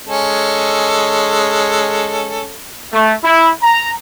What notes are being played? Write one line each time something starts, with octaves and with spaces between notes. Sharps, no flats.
G#3 C#4 A4
A3
E4
A#5